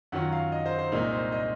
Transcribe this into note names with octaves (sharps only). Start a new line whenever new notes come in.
F#2 D#3 F#3 C#4 F4 F#5
F5
D#5
C5
C5
C2 A#2 G#3 D#4 A#4
C5
D#5